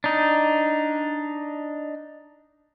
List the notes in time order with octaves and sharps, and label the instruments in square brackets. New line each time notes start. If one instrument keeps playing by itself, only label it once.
[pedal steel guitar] D4 D#4